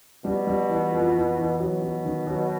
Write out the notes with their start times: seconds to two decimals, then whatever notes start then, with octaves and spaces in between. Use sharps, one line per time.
0.25 B2 G3
0.47 G3
0.69 E3
0.92 F2
1.15 E3
1.37 E3
1.60 B2 F#3
1.82 F#3
2.05 D#3
2.27 F#3